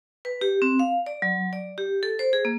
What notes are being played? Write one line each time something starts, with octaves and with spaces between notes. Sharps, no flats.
B4
G4
C4
F5
D5
F#3
D5
G4
A4
C5
G#4
A#3